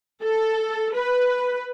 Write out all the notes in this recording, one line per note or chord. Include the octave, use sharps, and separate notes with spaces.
A4
B4